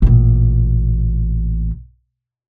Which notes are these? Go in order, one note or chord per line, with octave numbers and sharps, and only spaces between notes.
A1 A#2